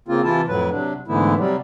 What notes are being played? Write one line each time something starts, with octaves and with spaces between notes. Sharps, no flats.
C#3 A#3 C4 F4
C3 E3 E4 F4 A5
F2 A2 F#3 B4
C3 F#3 D4
G#2 D3 E3 A3 B3 E4
C3 F#3 G3